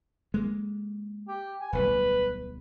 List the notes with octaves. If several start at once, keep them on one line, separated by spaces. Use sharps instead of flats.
G#3 A#3
G4
G#5
D1 B1 G3 B4